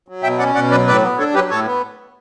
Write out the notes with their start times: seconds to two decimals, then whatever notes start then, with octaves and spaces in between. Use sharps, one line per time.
0.08 F#3
0.23 B2 E5 G5
0.39 C#4 D5 F#5
0.55 B2 D5 F#5
0.71 F#3 B4 D5
0.87 A2 B4 D5
1.03 B3
1.18 D4 A4 C#5
1.34 F#3 G4 B4
1.50 A2 A4 C#5
1.66 B3